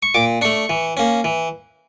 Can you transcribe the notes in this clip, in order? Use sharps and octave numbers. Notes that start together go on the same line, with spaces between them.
C#6
A#2 D6
A3 D4 C#6
E3
A#3 C#4
E3